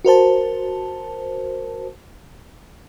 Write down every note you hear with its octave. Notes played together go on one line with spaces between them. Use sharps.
F#4 A#4 C5 A5